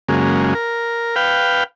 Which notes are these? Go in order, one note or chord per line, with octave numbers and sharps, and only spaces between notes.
F#2 C#3 G#3 A#3
A#4
B4 F5 G5